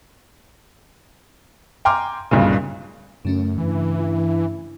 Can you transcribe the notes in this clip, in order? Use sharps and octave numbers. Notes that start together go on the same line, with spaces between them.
G5 G#5 A#5 C6 D6 F6
D1 B1 G2 A#2 C#3
F#2 C#3 A3 C#4
G2 E3
E4